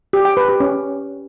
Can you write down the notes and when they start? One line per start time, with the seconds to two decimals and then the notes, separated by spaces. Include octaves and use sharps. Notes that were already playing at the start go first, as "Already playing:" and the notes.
0.13 G4
0.25 G5
0.37 B4
0.49 G4
0.60 C#4